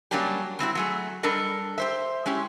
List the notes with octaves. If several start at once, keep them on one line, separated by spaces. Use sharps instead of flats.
F#3 G3 A#3 C#4 D4 G4
G3 C4 E4 F#4
F#3 A3 G#4
G3 D4 A4 A#4 D#5
G4 C5 E5
G#3 C#4 E4 G4